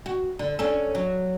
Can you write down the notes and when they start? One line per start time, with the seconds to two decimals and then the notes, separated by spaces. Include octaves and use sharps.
0.06 F#4
0.39 D3
0.59 C#4 D4 A4
0.95 F#3